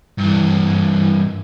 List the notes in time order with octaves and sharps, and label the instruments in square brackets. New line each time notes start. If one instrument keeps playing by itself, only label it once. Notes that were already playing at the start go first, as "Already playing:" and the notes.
[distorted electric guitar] G2 E3